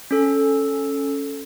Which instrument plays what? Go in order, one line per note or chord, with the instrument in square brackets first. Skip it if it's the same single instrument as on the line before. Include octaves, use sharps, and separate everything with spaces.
[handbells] C#4 A4